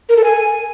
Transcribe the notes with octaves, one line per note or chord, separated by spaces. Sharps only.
A#4
A4
G#5